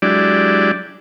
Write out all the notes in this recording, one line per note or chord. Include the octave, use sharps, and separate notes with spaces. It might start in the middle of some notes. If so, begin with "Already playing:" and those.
F#3 G#3 D4 E4 G4 D5